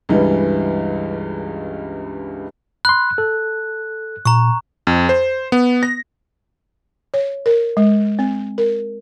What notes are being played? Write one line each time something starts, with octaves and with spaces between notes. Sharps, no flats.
C#2 G2 E3 G3
B5 C6 F#6
A4
A#2 A#5 C#6
F2
C5
B3
A#6
C#5
A#4
G#3
C4
A#4